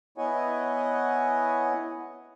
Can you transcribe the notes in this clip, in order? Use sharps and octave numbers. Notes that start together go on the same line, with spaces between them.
B3 E4 C#5 D#5 F#5 G#5